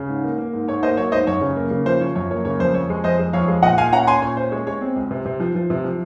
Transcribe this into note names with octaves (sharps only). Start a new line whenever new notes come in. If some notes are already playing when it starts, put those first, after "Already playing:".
Already playing: C#3
G#2
A#3
A#3
G#2
G#2 C#5
A#3 C5 D#5
F#3 C#5
G#2 C5 D#5
F#2 C#5
C#3
A#3
C#3
F3 C5
F3 C#5
F#2 C#5
A#3 C#5
C#3 C#5
F2 C5
F2 C#5
G#3 C#5
F2 C5 D#5
G#3
F2 C#5 F5
G#3
A#2 D#5 F#5
A#2 F5 G#5
C#4 F#5 A#5
C#4 G#5 C6
A#2 C#5
C#4 C5
G#3 C#5
G#3 C#5
C4
C#2
C3
C3
F3
F3
C3
F3